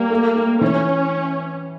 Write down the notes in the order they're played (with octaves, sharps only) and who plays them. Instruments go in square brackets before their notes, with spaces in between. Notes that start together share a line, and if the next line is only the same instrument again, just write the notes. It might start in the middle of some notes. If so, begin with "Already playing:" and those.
Already playing: [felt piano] G3 [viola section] A#3
[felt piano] A3
A3
[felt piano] E3 [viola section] C#4